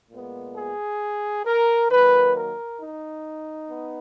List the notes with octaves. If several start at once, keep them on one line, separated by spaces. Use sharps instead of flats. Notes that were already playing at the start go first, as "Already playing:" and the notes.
A#2 G#3 B3
G#4
A#4
D#3 F#3 A#3 B4
A#4
D#4
B3